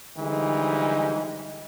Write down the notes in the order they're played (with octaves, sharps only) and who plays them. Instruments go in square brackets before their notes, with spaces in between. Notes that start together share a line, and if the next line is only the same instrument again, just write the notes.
[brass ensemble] D3 E3 F3 G3 G#3 D#4